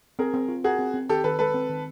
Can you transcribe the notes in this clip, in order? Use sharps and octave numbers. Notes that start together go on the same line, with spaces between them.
C4 G#4 A#4
C4
F4
F#4 G#4 A#4
C4
C4
D#3 G4 A4
D#3 A4 B4
G#3 A4 B4
C4
D#3